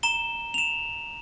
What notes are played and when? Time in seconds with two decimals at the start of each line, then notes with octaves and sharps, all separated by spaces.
0.03 A#5 E7 G7
0.54 E7 F7